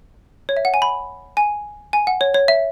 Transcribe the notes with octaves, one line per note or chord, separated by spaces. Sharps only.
C#5
E5
F#5
G#5
B5
G#5
G#5
F#5
C#5
C#5
E5